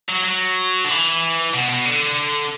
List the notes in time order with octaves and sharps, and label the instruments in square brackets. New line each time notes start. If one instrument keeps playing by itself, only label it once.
[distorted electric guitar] F#3
F#3
D3
E3
B2
B2
D3